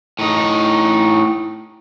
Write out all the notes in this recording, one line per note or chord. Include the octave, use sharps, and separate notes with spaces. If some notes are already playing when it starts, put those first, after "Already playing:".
A2 D#4